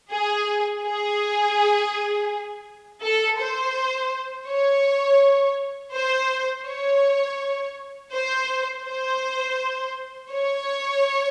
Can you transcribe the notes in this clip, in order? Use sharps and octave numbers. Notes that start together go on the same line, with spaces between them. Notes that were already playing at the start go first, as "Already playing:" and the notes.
G#4
G#4
A4
C5
C#5
C5
C#5
C5
C5
C#5